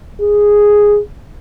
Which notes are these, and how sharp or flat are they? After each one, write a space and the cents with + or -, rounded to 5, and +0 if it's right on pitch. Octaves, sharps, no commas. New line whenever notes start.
G#4 -5